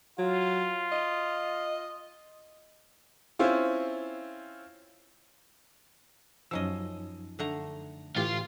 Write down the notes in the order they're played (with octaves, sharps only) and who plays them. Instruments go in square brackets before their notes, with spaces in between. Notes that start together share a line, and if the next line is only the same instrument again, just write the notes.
[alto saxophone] F#3 [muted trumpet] F4
[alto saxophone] D#5
[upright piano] C4 C#4 E4 F4
[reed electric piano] F#2 D#4 E6 [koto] F3 C#4 D#5
[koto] D3 A3 A#5
[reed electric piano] A2 E3 G4 [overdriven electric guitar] F4 F5